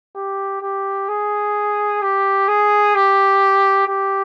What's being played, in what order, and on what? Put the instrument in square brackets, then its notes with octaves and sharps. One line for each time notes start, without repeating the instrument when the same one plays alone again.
[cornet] G4
G4
G#4
G4
G#4
G4
G4